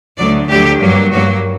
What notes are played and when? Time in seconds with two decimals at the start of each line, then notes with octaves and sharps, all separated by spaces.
0.17 D2 D3 F#3 D5
0.48 D2 D3 F#3 G4
0.80 G2 F#3 A#3
1.11 G2 F#3 A#3 F#4